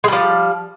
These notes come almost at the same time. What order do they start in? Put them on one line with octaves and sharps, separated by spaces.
G#3 G3 F3